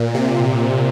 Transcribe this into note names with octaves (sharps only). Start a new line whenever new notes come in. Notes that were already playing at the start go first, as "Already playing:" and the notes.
Already playing: A#2
C3